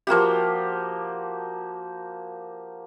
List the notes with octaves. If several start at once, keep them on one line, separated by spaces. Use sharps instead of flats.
F3 A#3 F#4 G4